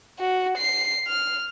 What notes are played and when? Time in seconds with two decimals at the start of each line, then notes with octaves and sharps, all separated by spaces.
0.19 F#4
0.57 C7
1.07 F6